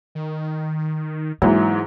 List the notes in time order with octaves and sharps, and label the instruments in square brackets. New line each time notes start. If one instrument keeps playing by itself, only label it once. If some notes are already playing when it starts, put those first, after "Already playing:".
[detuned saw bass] D#3
[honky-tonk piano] G#2 E3 F#3 [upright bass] A#3